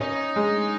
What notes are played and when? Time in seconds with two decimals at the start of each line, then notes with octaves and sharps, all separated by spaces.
0.01 C#4 D#4
0.36 G#3